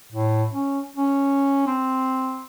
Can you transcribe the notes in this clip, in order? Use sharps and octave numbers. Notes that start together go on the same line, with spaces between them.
A2
C#4
C#4
C4